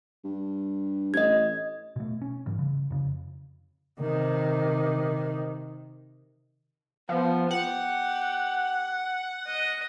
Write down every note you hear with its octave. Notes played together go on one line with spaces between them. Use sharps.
G2
A1 D#5 G#6
B2 A3
C#4
G#2 E3 G3
C#3
F2 C#3
C3 D#3
F3 B3
G4 F#5
D#5